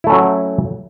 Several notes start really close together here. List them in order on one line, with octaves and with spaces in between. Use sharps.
E4 A3 C#4 F#3